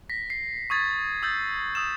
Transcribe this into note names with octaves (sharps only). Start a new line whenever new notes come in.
A#6 B6
C7
C#6 D#6 G#6 A6
D#6 E6 G6 A6
D#6 E6 E7